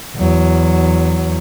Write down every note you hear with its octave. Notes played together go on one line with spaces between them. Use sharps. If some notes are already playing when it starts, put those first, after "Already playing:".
E2 F#3